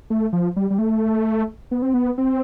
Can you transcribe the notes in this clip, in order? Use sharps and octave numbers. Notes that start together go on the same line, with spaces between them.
A3
F3
G3
G3
A3
B3
C4
B3
C4